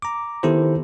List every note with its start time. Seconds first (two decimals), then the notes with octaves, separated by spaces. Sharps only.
0.02 A#5 D6
0.43 D#3 B3 E4 G4 A4 C5